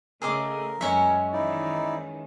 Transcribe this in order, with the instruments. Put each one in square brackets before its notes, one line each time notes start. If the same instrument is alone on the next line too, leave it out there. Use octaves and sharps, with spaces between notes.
[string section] C#3 A3 [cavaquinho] G#4 D#5 D6 [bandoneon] A#4
[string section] F#2 [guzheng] G#3 C#4 C#5 [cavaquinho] E5
[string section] D#3 E3 [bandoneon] D#4 E4 D5